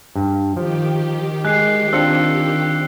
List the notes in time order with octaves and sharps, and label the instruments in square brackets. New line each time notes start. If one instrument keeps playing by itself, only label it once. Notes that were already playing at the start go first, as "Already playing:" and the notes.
[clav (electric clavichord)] G2
[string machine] D#3 G4 [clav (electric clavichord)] F3
[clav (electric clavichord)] G#3 G#5 [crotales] F#6 C7
[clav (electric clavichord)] C4 D4 F4 [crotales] E6 C#7